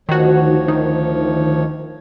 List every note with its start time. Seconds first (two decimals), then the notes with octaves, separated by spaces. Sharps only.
0.09 D2 D#3 F3 F#4 C#5
0.68 D#3